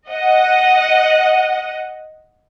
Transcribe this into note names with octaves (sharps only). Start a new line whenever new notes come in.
D#5 F#5